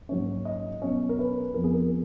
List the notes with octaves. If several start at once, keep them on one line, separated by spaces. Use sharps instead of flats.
G#2 F#3 A#3 C#4 C#5
D#5
B2 F#3 C#4 C#5
A#4
B4
F2 F3 B3 A#4
G#4
A#4